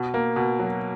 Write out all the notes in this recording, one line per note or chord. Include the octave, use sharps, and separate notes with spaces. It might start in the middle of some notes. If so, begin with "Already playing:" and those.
Already playing: B2
A#3
B2
F#3